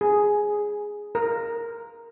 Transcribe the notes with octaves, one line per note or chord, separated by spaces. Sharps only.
G#4
A#4